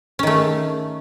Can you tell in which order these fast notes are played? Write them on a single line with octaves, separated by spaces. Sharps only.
C#4 D#3 A3